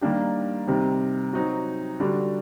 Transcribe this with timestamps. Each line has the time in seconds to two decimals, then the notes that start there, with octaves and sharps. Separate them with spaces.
0.01 D#3 G3 A#3 D4 G4
0.67 C3 D#3 G3 C4
1.33 F#3 C4 D#4 F#4
2.00 D3 G3 D4 F#4